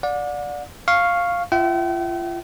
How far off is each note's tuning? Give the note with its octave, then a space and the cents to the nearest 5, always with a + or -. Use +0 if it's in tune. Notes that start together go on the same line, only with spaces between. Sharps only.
D5 +0 F#5 -40
F5 +0 C#6 -5
F4 -30 E5 +0 G5 -45